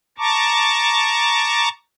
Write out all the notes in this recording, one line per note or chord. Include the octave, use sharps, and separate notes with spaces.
A5 A#5 C#6 D6